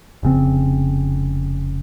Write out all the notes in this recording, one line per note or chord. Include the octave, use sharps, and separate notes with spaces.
F1 C#3 C4